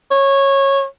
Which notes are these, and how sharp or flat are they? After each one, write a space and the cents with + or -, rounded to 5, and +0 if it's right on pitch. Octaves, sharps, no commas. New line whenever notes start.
C#5 -15